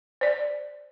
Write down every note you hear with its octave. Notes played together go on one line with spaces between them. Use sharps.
C5 D5